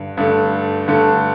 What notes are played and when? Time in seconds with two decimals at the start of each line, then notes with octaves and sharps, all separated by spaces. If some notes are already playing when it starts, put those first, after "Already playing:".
Already playing: G2 D3
0.17 G2 D3 A3
0.88 G2 D3 A3